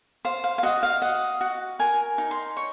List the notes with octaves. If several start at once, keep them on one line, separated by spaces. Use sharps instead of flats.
C5 F5
F5
F5
F#4 D#5
F5
D#5 F#5
F#4
A#4 G#5
D#4
C6
C#5